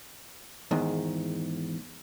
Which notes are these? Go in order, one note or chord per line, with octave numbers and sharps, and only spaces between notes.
E2 G#2 D#3